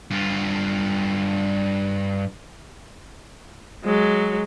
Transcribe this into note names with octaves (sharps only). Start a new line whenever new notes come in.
G2 F4
F#3 G#3